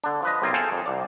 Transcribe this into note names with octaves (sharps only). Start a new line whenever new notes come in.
D3 D4
F3 B4 D#5
B1 C3 A#3 C4 F4
G#4 A4 C5 F5 G5
F2
C2 D5